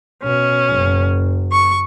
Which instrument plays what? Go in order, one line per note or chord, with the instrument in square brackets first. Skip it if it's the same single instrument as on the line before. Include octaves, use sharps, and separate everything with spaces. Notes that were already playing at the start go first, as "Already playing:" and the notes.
[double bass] B2 [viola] C#4
[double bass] F#1 F#2
[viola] C#6